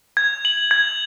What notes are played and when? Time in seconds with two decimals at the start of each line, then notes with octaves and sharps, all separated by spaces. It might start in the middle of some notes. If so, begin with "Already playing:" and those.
0.17 G#6
0.45 F#7
0.71 G#6